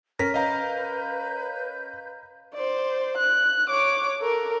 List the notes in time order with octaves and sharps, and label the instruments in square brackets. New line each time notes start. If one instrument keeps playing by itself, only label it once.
[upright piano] C#4 A#4 [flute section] F6 [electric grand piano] A#6 B6
[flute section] B4 G6 [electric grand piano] D#5 F5 A#5
[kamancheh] C5 D5
F#6
C#5 D6
A4 A#4